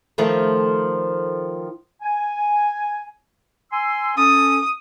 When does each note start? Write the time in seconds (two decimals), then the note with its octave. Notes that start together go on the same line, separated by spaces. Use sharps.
0.18 D#3 F3 A3
2.02 G#5
3.72 G#5 C6 E6
4.17 C#4 A4 D#6